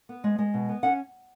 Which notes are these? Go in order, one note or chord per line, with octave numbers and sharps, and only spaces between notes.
B3
G#3
G#3
B2
B3
C#4 F#5